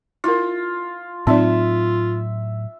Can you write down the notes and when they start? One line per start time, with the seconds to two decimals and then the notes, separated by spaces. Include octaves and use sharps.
0.24 E4 F4 A#4
1.27 A2 F#3 C4 D#4 F4 D5 E5